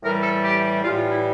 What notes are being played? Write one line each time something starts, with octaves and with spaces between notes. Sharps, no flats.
A2 E3 G3 A#4
A4
G4
A2 E3 G3 F4
F4
E4